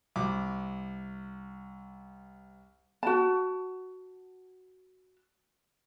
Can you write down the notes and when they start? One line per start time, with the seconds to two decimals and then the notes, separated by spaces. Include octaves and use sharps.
0.16 C2 D6
3.03 F#4 A5